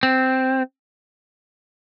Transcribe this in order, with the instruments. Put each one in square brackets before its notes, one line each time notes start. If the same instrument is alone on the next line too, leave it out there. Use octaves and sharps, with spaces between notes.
[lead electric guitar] C4